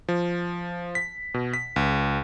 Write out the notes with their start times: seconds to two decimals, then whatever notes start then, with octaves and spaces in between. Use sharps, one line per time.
0.08 F3
0.95 B6
1.34 B2
1.54 B6
1.76 C#2